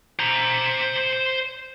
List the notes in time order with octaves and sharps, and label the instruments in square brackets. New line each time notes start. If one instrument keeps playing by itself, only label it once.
[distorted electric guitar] C5 A#5